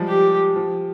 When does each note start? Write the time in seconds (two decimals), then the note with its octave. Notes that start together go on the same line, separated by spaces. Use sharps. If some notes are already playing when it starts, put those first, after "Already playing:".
Already playing: F3 G3 G#3
0.08 G4
0.56 F3